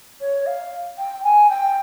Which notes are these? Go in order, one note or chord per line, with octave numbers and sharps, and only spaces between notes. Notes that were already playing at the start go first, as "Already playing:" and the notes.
C#5
F5
G5
G#5
G5